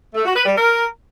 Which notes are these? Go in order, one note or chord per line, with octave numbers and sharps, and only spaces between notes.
A3
F#4
B4
G3
A#4